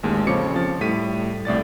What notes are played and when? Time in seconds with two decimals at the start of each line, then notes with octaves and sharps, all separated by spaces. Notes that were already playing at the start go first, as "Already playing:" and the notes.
0.03 A1 D#2 G#3
0.27 F2 C#3 F3 C#5 D6 C#7
0.56 F3 A6
0.81 A2 G3 B6 D#7
1.45 C2 A2 D5 A6